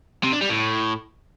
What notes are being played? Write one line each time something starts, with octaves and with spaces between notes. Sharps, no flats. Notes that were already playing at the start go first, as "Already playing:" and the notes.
C3
D4
G3
A2